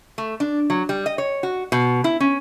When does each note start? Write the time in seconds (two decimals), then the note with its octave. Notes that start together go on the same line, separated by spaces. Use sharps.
0.18 A3
0.40 D4
0.70 F#3
0.89 G3
1.06 D#5
1.18 C#5
1.43 F#4
1.72 B2
2.04 E4
2.20 C#4